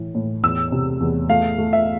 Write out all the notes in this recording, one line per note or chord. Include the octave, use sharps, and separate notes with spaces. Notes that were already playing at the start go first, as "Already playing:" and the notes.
Already playing: A2 E3
A2
E2 E6
C3
E2
A3 F5
A3
E5